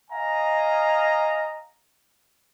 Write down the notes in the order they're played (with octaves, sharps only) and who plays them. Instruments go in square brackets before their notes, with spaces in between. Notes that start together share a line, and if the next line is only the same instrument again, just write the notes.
[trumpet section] D#5 F5 G#5 A#5